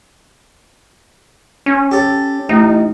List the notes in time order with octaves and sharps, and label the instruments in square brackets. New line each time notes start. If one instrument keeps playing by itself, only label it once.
[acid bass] C#4
[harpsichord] G4 A4
[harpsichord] A1 [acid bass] D#4